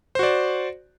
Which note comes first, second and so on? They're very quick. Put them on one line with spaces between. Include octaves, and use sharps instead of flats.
C5 F#4 D5